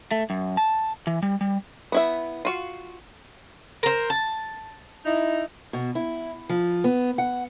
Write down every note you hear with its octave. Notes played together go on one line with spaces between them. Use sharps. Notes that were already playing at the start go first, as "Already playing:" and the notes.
A3
F#2
A5
E3
G3
G3
B3 E4 E5
F4 F#4 F5
A#4 C5
A5
D#4 E4
B2
E4
F3
B3
F#5